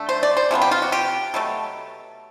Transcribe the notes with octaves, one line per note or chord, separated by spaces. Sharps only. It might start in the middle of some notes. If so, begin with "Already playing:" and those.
Already playing: D3 A3
C5
D5
C5
C3 F3 G#3 B3
G4
F4
F#4
G4
B2 F#3 A3